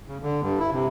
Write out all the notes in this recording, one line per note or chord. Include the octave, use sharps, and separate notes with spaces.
C#3
D3
G2
E4
C3